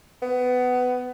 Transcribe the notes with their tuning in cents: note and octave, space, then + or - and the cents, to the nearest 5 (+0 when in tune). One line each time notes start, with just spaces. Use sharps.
B3 +20